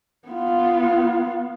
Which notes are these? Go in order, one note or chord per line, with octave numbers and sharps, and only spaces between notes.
B3 F4